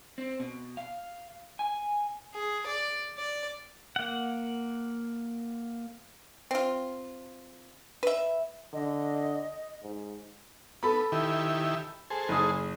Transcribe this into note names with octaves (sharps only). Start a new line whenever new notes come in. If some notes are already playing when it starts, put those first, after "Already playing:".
C4
B2
F5
G#5
G#4
D5
D5
A#3 F#5
C4 F4
B4 E5
D3 D#5
G#2
B3 A4 B5
D#3 E4 G4
G#4 A4 C5
F#1 D#6